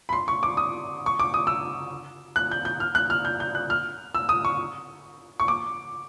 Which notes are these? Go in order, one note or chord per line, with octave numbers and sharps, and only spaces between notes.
B5
C6
C#6
D6
D#6
C#6
D6
D#6
E6
F#6
G6
G6
F6
F#6
F6
G6
G6
F#6
F6
E6
D#6
C#6
C#6
D6